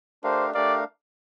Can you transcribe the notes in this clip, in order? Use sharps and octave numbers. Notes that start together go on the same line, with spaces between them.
A3 D4 G4 A#4 C5 F5
A3 D4 G4 A#4 D5 F5